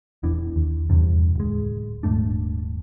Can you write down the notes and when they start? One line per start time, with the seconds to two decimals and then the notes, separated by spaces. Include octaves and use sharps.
0.23 D#1 E2 E3 D4
0.56 D#2
0.90 E2 G2 C3
1.36 D1 G#3
2.03 D#1 G#2 A3 D4